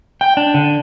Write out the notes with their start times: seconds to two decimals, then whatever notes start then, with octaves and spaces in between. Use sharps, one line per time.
0.21 G5
0.37 D4
0.54 D3